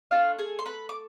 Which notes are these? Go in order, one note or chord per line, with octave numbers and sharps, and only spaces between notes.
A3 D4 F4 A4 F5
G#4 G#5
C6
B4 B5
D6